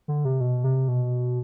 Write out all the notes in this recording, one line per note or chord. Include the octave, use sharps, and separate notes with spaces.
D3
C3
B2
C3
B2